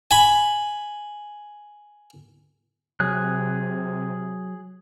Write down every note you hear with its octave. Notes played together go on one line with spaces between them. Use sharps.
G#5 B5
C3 F#3 G#4 F#6